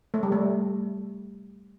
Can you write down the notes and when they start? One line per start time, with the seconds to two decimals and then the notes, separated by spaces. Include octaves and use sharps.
0.14 A3
0.23 G3
0.32 A3